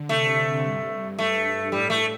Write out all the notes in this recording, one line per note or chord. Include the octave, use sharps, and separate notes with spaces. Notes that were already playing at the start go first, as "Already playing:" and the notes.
Already playing: D3
C3 A3
G2
G2 A3
A2 G3
A3